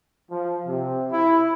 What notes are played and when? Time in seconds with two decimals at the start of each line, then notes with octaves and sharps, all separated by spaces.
0.30 F3
0.67 C3
1.11 E4